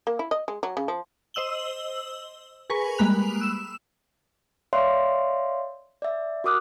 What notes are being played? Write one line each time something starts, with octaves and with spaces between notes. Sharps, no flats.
A#3
E4
D#5
G#3
F#3
C#3
F3
C5 D#5 E6 F#7 G7
G#4 A#4 B4 G#5 C#6
G3 G#3 A#3 B5 F#6 F7
E6 E7
C#5 D5 E5 F5 C6
D5 E5
F#4 A#4 D6 D#6 F6 F#6